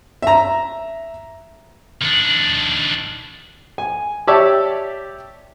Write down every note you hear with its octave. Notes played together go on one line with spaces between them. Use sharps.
E5 A#5
D#3 D4
G#5
G4 C#5 D5 E5 A5 E6